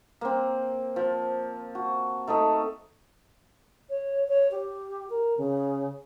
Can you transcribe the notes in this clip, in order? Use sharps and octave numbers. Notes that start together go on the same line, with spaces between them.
A#3 C4
F3
F#4
A3 D#4 A4 D#5
C#5
C#5
G4
A#4
C#3